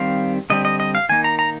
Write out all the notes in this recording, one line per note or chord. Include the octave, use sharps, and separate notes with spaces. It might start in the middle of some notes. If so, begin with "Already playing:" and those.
Already playing: D#3 G3 C4 F5
D3 G3 C4 D#5
D#5
D#5
F5
D#3 A#3 D#4 G#5
A#5
A#5